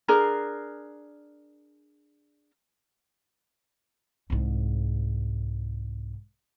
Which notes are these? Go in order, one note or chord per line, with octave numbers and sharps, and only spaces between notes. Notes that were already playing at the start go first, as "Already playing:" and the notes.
D4 G#4 A#4
C2 G#2